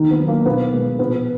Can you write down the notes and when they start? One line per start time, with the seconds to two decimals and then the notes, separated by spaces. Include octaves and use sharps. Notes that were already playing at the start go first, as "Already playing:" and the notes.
Already playing: D#2 D#3 D#4
0.11 B3
0.20 D#3 F#3
0.28 A#3
0.45 B1 B3
0.73 B2 G#3
0.99 A#1 B3